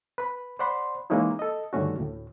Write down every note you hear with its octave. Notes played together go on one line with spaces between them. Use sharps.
B4 B5
C5 D5 F#5 B5 C6
E3 G#3 A#3 C#4 D#4 E4
A4 D#5
G2 D3 D#3 A3 C#4 F#4
D2 A2